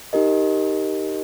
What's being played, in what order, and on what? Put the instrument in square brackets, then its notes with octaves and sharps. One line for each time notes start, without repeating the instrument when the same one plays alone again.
[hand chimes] D#4 G4 A#4 D#5